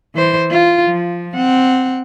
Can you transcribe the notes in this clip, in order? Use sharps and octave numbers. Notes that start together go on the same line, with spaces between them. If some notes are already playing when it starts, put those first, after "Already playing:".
E3 C5
F4
F3
C4 F#5